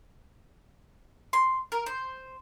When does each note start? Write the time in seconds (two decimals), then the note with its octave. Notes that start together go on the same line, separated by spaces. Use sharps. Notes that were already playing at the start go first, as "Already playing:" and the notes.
1.33 C6
1.72 A#4
1.86 C5